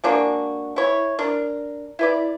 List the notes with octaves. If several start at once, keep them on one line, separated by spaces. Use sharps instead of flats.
G#3 A#3 D4 F#4
E4 C#5
D4 A#4
E4 B4 D5